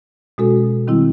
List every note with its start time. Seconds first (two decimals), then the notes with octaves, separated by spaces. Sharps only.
0.38 B2 G#3 C#4 F#4 A4
0.88 D#3 G3 C4 E4